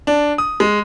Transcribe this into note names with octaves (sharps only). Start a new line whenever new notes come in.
D4
D#6
G#3